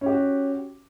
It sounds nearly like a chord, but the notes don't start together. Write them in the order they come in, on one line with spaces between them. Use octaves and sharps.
C#4 G4 F#4